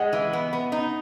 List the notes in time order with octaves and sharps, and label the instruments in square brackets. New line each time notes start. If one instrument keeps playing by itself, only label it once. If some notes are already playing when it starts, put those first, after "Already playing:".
Already playing: [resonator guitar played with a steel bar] G#3 [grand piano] D#5 F#5
[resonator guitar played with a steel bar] E3
B3
B3
D#4